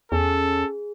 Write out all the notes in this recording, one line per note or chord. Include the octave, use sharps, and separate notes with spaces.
E2 C#4 G#4 A4